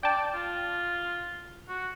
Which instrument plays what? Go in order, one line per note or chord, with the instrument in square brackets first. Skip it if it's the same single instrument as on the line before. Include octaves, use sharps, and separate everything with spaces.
[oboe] D5 [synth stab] G5 A5
[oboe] F4
F#4